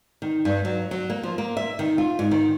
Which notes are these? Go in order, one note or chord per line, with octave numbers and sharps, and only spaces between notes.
D#3
G2
F#3
F#3
A#3
F3
A#3
E5
D#3
F4
G#2
D#3